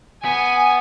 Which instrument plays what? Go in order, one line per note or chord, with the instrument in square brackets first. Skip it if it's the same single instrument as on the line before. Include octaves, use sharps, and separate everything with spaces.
[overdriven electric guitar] B3 [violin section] G#5